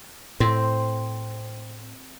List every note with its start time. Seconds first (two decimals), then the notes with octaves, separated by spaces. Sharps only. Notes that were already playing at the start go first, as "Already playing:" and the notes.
0.40 A2 C4